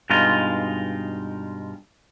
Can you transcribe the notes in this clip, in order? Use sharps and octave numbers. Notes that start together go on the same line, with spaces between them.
G2 B2 G#3 D#4 F4